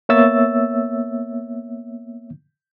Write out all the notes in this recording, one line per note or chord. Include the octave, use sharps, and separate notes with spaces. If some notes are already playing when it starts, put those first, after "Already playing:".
A#3 B3 C#5 E5 E6 A6